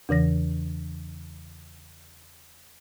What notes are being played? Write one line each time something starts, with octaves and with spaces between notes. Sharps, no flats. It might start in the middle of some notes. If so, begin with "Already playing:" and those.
E2 C#3 E3 A#6